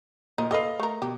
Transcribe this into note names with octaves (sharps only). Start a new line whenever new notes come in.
A#2 F3 D#4
G4 A4 B4 D#5 F5
A3 A#4
B2 G4